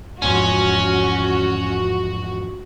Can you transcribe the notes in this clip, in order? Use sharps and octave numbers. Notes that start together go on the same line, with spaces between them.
E2 G#2 F3 C#4 F#4